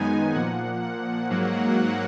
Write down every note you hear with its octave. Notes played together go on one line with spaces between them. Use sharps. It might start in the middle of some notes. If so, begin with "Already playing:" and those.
Already playing: F#2 D#3 G#3 B3 D#4 G#5
A#2 F3 A#3 F#5
F#5
G#2 F#3 A#3